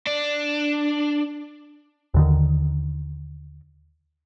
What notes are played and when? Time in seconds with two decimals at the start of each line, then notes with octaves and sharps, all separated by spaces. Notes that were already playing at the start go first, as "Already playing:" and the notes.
0.07 D4
2.14 D#2 D3 D#3